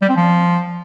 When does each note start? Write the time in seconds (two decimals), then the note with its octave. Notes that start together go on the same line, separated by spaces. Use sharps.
0.02 G3
0.09 C4
0.16 F3